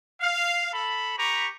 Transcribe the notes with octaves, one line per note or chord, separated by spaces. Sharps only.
F5
A4 B5
G4 B4 A#5 C#6